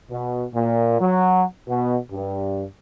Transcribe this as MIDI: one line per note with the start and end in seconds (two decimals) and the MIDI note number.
0.10 0.44 47
0.54 0.99 46
1.00 1.44 54
1.68 1.96 47
2.11 2.64 43